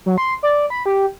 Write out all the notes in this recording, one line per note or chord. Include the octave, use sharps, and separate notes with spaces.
F#3
C6
D5
B5
G4